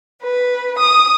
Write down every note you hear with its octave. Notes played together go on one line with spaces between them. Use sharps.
B4
D#6